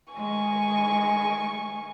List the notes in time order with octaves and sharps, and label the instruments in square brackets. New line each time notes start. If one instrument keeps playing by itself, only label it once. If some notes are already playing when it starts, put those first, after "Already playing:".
[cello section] D#3 G#3 [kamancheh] G#5 C#6